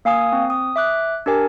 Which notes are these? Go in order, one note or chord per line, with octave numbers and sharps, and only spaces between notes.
A#3 F5 G#5 D#6
C4
D#6
E5 D6 F#6
D4 G4 A#4 G#5